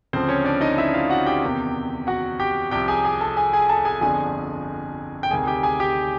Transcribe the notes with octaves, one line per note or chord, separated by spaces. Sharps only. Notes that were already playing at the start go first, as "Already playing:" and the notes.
D2 C#3 F3 C4 C5
C#4 C#5
D4 D5
D#4 D#5
E4 E5
F4 F5
F#4 F#5
G4 G5
E2 C3 D#3
F#4 F#5
G4 G5
C2 C3 F3 G4 G5
G#4 G#5
G#4 G#5
A4 A5
G#4 G#5
G#4 G#5
A4 A5
G#4 G#5
G1 F2 D3 F3 G#4 G#5
G5
D2 C3 D#3 G#4 G#5
G4 G5
G#4 G#5
G4 G5